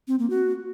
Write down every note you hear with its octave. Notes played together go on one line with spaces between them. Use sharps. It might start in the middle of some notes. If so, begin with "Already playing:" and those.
C4
A#3
F#4